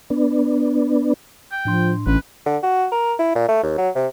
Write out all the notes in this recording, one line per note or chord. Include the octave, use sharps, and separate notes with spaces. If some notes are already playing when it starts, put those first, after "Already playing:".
B3 D4
G5
A2 F3 D4 C6
A1 C#4 B4
D3
F#4
A#4
E4
A#2
A3
D#2
F#3
C3